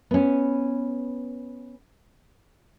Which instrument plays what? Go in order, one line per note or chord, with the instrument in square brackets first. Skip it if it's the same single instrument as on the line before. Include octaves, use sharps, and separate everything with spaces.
[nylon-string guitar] B3 C#4